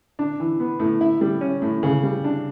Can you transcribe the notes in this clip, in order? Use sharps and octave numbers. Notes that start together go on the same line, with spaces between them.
D4
E3
B3
A2
E4
G3
C#4
A2
C#3
G3
D4